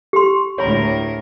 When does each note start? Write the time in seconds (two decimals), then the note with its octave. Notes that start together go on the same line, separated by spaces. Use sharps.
0.13 G4 C6
0.58 D2 A2 A#4 C#5 B5